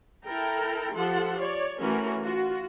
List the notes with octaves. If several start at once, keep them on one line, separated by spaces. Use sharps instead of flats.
E4 A4 A#4 G5 A#5
F3 G4 A4 F#5 C6
C#5 D5
E3 A3 C#4 F#4 A#4
F4 F#4